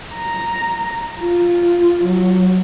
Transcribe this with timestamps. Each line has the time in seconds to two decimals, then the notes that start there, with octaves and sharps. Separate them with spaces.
0.14 A#5
1.21 F4
2.05 F#3